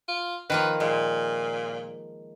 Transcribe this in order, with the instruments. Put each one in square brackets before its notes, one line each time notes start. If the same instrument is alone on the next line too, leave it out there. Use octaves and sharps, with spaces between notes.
[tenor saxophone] F4
[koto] D#3 F3 A#3 [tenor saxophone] B4
[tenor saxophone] A#2 [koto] G#3